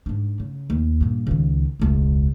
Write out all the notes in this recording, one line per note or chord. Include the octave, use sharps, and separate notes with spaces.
G#2 D4
C#3
D#2
G2 A#2
C#2 D#3
E1 C#2